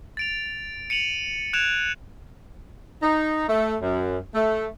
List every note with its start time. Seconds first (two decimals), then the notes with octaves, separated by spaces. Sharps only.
0.17 A6 D7 F7
0.90 C#7 D#7 F7 F#7
1.53 F#6 G#6 D7 E7 F7
3.02 D#4
3.49 A3
3.81 F#2
4.34 A3